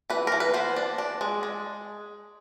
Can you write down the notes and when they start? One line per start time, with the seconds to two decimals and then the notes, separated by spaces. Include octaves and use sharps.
0.10 E3 B4
0.27 E3 A#4
0.40 B4
0.54 B3 C5
0.76 D4
0.98 D4
1.21 G#3
1.43 G#3